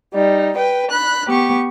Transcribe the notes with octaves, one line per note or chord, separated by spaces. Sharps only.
G3 D#4
B4 G5
B5 F#6
B3 G4 C#6